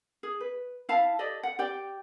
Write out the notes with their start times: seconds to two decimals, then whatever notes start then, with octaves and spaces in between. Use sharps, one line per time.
0.23 G#4
0.40 B4
0.89 E4 F5 A5
1.19 G4 A4 D5 D#5
1.43 F#5
1.59 G4 D5 G5